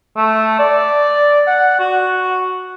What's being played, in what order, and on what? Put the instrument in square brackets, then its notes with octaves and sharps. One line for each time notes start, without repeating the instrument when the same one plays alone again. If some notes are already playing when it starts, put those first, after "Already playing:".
[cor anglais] A3
D5
F#5
F#4